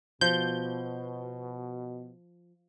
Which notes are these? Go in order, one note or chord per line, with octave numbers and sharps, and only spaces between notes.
B2 F3 G6